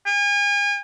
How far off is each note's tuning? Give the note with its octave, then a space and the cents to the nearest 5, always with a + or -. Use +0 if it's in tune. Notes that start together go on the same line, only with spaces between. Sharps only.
G#5 -35